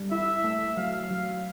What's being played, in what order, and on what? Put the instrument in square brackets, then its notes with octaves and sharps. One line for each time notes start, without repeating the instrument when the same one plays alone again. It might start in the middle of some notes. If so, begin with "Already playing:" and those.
Already playing: [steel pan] G3
[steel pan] E4 [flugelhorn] E5
[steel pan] A3
[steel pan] F#3 [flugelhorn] F5
[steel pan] F#3